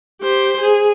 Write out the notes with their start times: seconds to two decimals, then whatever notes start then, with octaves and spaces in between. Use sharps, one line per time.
0.21 G4 C5
0.61 G#4